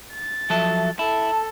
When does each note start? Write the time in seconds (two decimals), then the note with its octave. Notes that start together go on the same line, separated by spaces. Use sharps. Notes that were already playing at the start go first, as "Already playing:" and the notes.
0.13 A6
0.50 F3 F#3 A4 E5
0.99 E4 A4 A5